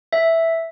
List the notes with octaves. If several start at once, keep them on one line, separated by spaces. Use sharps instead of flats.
E5